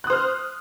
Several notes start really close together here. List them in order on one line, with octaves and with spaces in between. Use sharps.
F#6 D#6 C5 F6